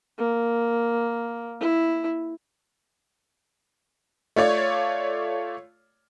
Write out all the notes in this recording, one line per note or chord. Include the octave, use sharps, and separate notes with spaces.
A#3
E4
A3 F4 C#5 D5